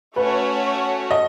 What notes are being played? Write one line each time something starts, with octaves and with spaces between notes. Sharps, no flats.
A3 C#4 F#4 B4 C#5
D#5